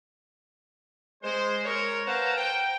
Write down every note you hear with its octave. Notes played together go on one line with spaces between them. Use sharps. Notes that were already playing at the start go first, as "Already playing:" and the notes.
G#3 C5
A#4 C#5
B4 C5 F5 F#5 A5 A#5
G5